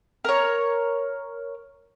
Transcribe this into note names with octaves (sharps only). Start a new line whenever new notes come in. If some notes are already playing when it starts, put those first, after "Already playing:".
A#4 C#5